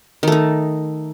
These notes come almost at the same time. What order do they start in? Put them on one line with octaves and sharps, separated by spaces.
D#3 A3 D#4